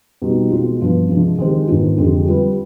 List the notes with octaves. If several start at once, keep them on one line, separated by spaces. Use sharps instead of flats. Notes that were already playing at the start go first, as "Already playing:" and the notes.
B2 G3 C4 D#4 G4
B2 G#3 C4 F4
G2 F3 B3
C3 F3 G#3 D4
D#3 G#3 C4 G4 C5
G#2 D#3 B3 D4 F4
F2 D3 G#3 C4 G4
G3 C4 F4 B4